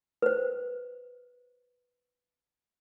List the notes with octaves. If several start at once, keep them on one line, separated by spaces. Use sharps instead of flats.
B4 C5